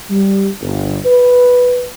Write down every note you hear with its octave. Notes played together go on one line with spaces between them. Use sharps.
G3
G1
B4